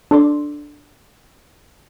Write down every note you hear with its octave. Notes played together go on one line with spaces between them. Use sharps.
D4 A4 D5 C6 D6